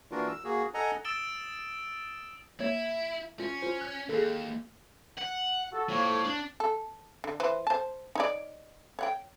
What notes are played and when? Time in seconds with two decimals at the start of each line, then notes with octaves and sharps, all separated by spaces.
0.11 E3 A#3 D4 F4 F#4 A#4
0.28 E6
0.44 A#3 F#4 G#4
0.74 A4 D#5 F#5 G#5 A#5
1.05 D#6 E6 A6 D7 E7 G7
2.60 A#3 E4 C#5 G#6
3.40 C#4 F4
3.62 F4 C5
3.81 F#6 G#6
4.09 D#2 G#4 A4
5.17 F#5
5.73 F#4 A4
5.89 F2 A2 A#3 C#5
6.25 D4
6.60 A4
7.24 D3
7.40 E3 B4 C5
7.67 C5 A5
8.15 D#4 C#5 D5
8.99 C#5 F#5 G5